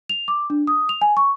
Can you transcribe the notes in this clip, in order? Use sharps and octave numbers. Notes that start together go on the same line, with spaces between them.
F7
D6
D4
D#6
F7
G#5
C#6